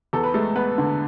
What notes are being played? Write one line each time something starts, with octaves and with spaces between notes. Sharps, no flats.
E2 A4
B4
G#3 A3 A4
B3 B4
D3